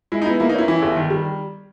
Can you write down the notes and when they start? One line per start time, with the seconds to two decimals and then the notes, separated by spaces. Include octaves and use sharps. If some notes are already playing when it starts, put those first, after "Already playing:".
0.12 G#3 E4
0.22 D#4
0.26 B3 E4
0.40 A#3 E4
0.49 D#4
0.54 C#4 E4
0.68 E3 E4
0.82 G1
0.96 D#3
1.10 G3